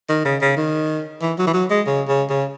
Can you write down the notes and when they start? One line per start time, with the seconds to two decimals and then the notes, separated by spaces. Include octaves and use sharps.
0.09 D#3
0.25 C#3
0.41 C#3
0.57 D#3
1.22 E3
1.38 F#3
1.47 E3
1.54 F#3
1.70 G#3
1.86 C#3
2.08 C#3
2.29 C#3